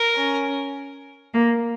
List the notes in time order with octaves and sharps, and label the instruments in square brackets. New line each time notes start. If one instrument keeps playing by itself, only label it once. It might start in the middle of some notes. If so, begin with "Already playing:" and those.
Already playing: [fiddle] A#4
[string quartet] C#4
A#3